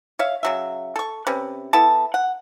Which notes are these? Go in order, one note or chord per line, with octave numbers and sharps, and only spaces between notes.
C#5 E5 F5
C#3 F#3 E5
A4 C#6
C3 C#4 B4
B3 E4 A4 A5
F#5